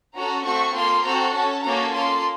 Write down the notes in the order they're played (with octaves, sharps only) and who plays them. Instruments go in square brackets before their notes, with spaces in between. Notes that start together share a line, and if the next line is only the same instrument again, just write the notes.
[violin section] C#4 F#4 A4 A#5
A3 C4 F#4 A4 C#6
A#3 F4 A4 C6
C4 F#4 A4 A#5
C#4 A4 A5
A#3 C#4 F#4 A4 A#5
A#3 F4 A4 C6